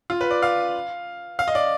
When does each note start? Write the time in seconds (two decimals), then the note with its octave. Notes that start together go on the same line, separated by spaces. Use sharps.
0.10 F4
0.21 B4
0.31 D5
0.42 F5
1.39 F5
1.48 D#5
1.55 D5